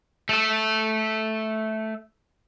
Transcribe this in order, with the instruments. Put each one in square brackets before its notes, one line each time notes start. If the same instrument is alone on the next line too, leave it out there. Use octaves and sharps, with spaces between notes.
[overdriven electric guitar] A3 A4